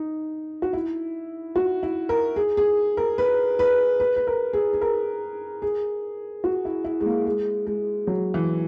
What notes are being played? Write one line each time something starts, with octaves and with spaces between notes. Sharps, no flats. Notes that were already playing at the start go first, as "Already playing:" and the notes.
Already playing: D#4
F#4
E4
F#4
E4
A#4
G#4
G#4
A#4
B4
B4
B4
B4
A#4
G#4
G#4
A#4
G#4
F#4
E4
E4
G#3
A#3
G#3
G#3
F#3
E3